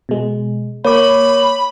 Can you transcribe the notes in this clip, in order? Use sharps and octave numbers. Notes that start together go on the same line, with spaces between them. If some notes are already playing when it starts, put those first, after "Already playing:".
B2 G#3
A#3 C#5 B5 D6